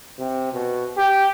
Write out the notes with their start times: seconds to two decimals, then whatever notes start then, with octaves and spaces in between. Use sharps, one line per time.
0.19 C3
0.53 B2
0.97 G4